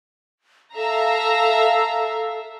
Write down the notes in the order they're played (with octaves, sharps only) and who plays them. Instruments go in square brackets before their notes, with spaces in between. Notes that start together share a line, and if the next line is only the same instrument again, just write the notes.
[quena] A4 [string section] E5 F5 A#5